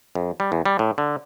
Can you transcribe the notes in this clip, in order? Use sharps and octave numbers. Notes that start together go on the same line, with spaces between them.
F2
G3
E2
G3
A2
D3